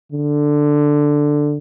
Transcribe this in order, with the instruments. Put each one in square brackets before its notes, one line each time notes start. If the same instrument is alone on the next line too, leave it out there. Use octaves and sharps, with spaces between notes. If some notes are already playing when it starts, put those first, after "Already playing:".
[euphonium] D3